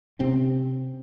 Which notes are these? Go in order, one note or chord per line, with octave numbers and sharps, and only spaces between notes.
C3 C4 C#4